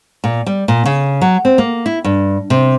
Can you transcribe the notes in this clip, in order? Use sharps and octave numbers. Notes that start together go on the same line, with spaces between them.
A#2
G3
A#2
C#3
F#3
C4
A#3
E4
G2
C3